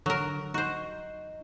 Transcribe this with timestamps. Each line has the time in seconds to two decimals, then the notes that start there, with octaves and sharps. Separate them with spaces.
0.06 D3 F#3 A#4
0.54 D#4 F#4 C5